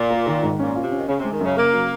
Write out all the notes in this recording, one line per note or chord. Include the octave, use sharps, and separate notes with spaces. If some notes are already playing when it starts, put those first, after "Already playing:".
Already playing: A#2
A#3
D#3
G#2
A#2 C#4
F4
C3
C#4
D#3
C#3 C#4
C3 G#3
D#3
F#2 C#3
C#3 A#3
F#3